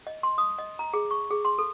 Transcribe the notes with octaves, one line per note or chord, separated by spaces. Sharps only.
D#5
C6
D#6
D#5
A#5
G#4
C#6
G#4
C6
A4